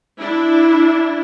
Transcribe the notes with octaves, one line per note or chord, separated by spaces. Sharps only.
D4 E4